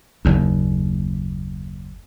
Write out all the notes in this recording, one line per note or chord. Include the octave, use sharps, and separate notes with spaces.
F#1 D#2